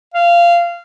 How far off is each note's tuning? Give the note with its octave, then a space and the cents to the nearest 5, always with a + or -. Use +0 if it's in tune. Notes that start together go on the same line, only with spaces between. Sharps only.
F5 -20